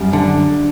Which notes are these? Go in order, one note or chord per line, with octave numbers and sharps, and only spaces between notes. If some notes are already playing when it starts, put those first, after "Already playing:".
Already playing: F#2 G3
D3